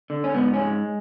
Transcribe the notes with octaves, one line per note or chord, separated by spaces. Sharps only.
D3
C#4
G#2 B3
C#4
G#3